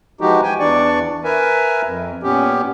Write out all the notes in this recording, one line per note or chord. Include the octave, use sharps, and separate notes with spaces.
E3 F3 G#3 D#4 F#4 G4
G5 G#5
E2 E3 D4 D5 C#6
A#4 B4 E5 G#5
F2
A#2 B3 C#4 G4